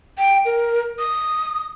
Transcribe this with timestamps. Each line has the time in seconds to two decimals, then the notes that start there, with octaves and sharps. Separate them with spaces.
0.18 G5
0.45 A#4
0.99 D#6